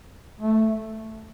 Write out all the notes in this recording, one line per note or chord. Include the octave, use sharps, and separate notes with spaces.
A3